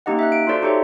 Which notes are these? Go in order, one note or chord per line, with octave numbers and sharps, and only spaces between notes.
A#3 C#4 D#4 G4 D#5 F#5
E5 F#6
D7
F4 F#4 A4 C5 D5
D#4 G4 A4 C5 C#5 E5